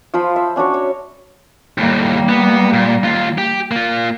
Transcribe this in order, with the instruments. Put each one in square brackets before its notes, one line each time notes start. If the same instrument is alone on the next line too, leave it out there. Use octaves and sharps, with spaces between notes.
[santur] F3 F4 C5 B5
E5
C#4 D4 F#4 C#5
C#5 E6
[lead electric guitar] D#2 A2 [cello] G3 A#3
[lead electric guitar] B3
A#2
D#2 F4
G4
A#3 F4